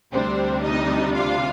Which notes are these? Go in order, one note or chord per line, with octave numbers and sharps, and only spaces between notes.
D2 C3 G3 C4 D4 C5
D#4 D#5
F4 F5